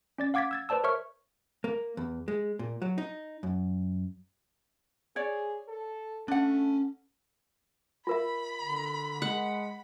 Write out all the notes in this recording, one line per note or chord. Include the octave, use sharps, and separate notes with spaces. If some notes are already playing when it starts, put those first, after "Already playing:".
C#4 D5 A6
F5 F#5 D6 G#6 A6 B6
E6 G#6 A6
B4 C5 D5 A5 E6
A#4 C5 C#5 E5 C#6 F6
A#3
E2
G#3
A#2
F#3
D#4
F#2
G#4 C#5 D5
A4
A3 C#4 D4 F#5
F4 A#4 E5 B5
D3
G#3 F#5